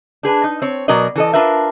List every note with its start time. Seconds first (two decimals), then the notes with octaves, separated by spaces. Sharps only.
0.23 D4 G#4 B4
0.44 D#4
0.62 C4 C#5
0.88 B2 F#3 A#4 D5 D#5
1.16 E3 A4 D#5
1.33 D4 F4 A#4 B4 E5